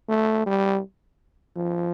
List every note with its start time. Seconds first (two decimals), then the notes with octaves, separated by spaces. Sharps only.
0.09 A3
0.46 G3
1.56 F3